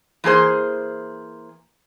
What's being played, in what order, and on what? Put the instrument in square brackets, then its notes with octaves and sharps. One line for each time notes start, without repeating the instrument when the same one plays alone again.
[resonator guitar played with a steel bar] E3 A#3 G#4 C5